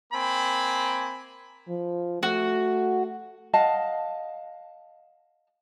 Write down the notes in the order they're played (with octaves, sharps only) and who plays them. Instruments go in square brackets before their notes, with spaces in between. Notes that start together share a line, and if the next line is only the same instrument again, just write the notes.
[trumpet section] A#3 C4 G#5 B5
[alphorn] F3
[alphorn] A3 [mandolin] F#4
[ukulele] D#5 F5 F#5 A5